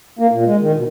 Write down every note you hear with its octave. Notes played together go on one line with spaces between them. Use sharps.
A#3
A#2
G#3
D#3
B2